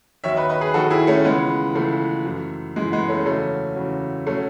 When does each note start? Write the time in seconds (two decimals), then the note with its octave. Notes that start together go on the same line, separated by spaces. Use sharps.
0.24 D#2 D#3 F#3 C#5 E5
0.36 B4 D#5
0.49 B4 D#5
0.61 G#4 B4
0.74 D#2 D#3 F#3 F#4 A4
0.90 E4 G#4
1.07 A3 C#4
1.24 C#2 C#3 E3 G#3 B3
1.74 C#2 C#3 E3 A3
2.26 F#2 E3
2.76 F#2 E3 G#3
2.92 G#3 B3
3.09 A3 C#4
3.26 E2 C#3 F#3 A3 C#4
3.76 E2 C#3 F#3
4.27 B2 F#3 A3 C#4